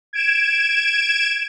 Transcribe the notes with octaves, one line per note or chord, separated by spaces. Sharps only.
G#6 D7 E7